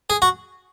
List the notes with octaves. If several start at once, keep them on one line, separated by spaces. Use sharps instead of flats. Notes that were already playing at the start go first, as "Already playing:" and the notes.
G#4
F#4